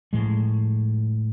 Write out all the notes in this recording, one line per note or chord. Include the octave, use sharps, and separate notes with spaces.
A2 F3 G#3